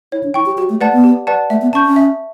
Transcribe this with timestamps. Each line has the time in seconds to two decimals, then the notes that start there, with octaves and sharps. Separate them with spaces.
0.12 E4 C#5
0.23 D4
0.34 E4 G5 C#6
0.46 G4
0.58 F#4 G4
0.69 A3
0.81 A3 B4 D5 F#5 A5
0.93 B3
1.04 G4
1.27 B4 D5 F#5 A5
1.50 A3 E5
1.62 B3
1.73 C#4 A5 C#6 G6
1.85 C#4
1.96 E5